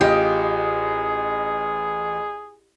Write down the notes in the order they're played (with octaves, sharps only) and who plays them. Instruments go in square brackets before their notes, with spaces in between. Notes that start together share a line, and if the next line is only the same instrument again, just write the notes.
[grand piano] A1 F4 D#5 [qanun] G4 [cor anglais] G#4